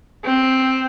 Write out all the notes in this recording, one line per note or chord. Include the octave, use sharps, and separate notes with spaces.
C4